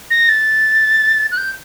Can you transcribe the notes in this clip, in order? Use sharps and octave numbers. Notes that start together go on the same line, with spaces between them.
A#6
A6
F#6
G6